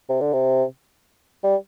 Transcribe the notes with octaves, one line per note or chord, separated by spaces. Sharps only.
C3
D3
C3
G3